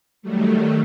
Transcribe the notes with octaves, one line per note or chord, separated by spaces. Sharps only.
D#3 F#3 G3 A3